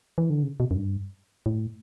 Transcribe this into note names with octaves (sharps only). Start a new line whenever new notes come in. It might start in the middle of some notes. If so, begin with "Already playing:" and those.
E3
D3
C#3
B2
F#2
G2
A2